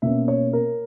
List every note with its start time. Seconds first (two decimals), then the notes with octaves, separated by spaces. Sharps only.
0.02 B2 A#3 C#4 E5
0.28 C#5
0.53 A#4